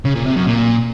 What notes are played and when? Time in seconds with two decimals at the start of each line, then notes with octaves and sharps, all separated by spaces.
0.05 C#3
0.15 A#2
0.26 C3
0.36 F#2
0.47 A#2